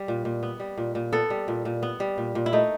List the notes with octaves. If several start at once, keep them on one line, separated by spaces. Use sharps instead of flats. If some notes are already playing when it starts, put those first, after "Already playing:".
Already playing: G3
A#2
A#2
B3
G3
A#2
A#2
B3 A4
G3
A#2
A#2
B3
G3
A#2
A#2
E4
A3 D#4